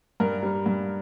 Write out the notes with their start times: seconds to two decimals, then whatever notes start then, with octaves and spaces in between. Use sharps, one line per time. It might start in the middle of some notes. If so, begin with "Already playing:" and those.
0.20 G2 A#4
0.43 G3
0.66 G2